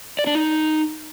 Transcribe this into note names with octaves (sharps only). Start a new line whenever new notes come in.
D5
D4
D#4